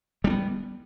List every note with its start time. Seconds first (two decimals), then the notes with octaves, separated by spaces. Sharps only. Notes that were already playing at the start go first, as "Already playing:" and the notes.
0.24 G3
0.27 D4
0.30 B3